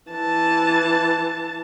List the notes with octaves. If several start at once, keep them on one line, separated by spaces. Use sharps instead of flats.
E3 A5